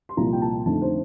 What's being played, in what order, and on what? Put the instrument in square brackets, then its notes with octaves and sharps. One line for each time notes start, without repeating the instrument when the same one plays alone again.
[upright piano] C6
C2 A#2 F3 A#5
G5
A5
F2 D3 A3 D#4 A5
C5